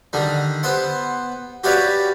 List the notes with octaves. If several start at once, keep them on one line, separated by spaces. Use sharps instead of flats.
D3 D#3 G3
B3 C5 F#5
F#4 G4 B4 C#5 D5 F5